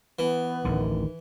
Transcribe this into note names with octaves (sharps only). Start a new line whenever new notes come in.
E3 B3
D1 A1 D3 D#3